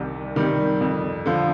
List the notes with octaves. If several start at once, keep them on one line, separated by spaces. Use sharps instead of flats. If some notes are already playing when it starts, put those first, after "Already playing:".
Already playing: C2 C3 D#3 G3
C3 D#3 G3
F2
D3 F3